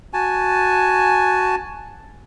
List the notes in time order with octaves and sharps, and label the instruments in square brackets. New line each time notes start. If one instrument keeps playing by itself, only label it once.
[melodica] F#4 G#5 A5